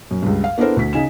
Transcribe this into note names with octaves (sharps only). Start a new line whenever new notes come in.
F#2
C#2 G2
F5
B3 D4 E4 A4 A#4 C5
D2 B6
C#3 D#4 G#5 E7